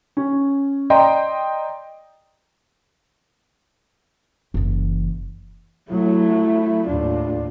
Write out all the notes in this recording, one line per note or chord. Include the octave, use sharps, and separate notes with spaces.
C#4
D5 D#5 G5 A#5 C6
F#1 E3
F#3 A3 E4
D#2 A2 D4 F4